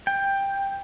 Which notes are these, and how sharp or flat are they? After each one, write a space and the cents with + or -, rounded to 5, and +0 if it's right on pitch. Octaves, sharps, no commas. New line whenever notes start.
G5 +10